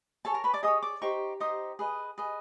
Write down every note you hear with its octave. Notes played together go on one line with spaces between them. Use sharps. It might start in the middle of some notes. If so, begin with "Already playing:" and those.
G#4 A4 C#5 A5
A#4 A#5
B4 B5
D5 D6
G#4 C#5 D#5 D#6
D5 D6
D#4 G4 C5 C#6
D#4 G4 C5 D#6
G#4 B4 D#5
G#4 B4 D#5